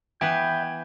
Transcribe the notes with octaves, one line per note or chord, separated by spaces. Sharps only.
E3 B3 B4 E5 G5 G6 G#6